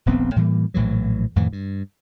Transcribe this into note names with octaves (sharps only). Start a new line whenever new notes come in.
D#1 A#1 B3 C4
A2 E3 G3 A#3
A#1 A2 E3 F#3
F2 A2 D#3 E3
G2